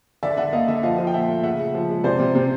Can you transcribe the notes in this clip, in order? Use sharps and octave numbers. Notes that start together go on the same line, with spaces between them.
D3 D5 E5
D3 E5 F#5
A#3 D#5 F5
D3 E5 F#5
F3 D#5 F5
F3
G5
A#2 E5 F#5
A3
C#3 E5 F#5
C#3
F3
G#3
C3 C5 D5
C3
C3